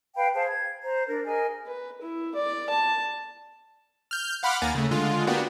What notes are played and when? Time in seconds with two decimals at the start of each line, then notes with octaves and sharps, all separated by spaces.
0.16 B4 F5 G5 B5
0.35 G#4 C5 F5 A5
0.46 G#6
0.82 C5 A#5
1.07 D4 A#4
1.25 G#4 A#4 D#5 G#5
1.67 B4
2.02 E4
2.35 D5
2.70 A5
4.11 F6 G6
4.43 F5 F#5 B5 C6 D6 F6
4.62 D#2 A#3 G#5 A#5 A6
4.75 C#3 A3
4.91 D3 G#3 F4
5.27 A#3 B3 D4 F#4 G4